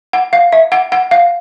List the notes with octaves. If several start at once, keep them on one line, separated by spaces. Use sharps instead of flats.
F#5
F5
E5
F#5
F#5
F5